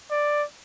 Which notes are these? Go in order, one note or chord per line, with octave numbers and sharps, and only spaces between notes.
D5